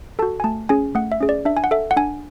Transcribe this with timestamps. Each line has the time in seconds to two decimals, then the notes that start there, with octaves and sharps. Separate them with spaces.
0.19 F#4 A4 A5
0.40 G#5
0.44 A3 A5
0.69 C#4 G#4 G#5
0.95 A3 F#5
1.12 E5
1.21 C#4 G#4
1.29 D5
1.45 D4 E5
1.57 G#5
1.64 F#5
1.71 A4 E5
1.91 F#5
1.96 D4 G#5